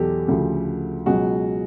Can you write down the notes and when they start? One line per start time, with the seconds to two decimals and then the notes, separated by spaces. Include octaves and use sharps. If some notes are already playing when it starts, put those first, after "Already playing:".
Already playing: E2 B2 F#3 G4 A4
0.28 D2 C#3 F3
1.06 C#2 B2 F#3 F#4 G#4